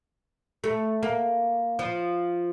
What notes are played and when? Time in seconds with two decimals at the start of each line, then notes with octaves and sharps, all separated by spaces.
0.64 A3
1.03 A#3
1.79 F3